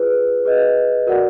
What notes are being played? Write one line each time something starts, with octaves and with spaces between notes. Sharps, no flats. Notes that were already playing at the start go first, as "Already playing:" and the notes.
Already playing: F4 G#4 B4
G#4 B4 D#5
F#4 A#4 D5 F#5